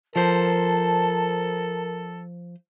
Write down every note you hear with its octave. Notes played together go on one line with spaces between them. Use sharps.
F3 A4 A#4 C5 A5